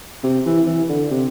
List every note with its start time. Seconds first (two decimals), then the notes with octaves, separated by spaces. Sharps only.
0.24 C3
0.46 E3
0.67 E3
0.89 D3
1.11 C3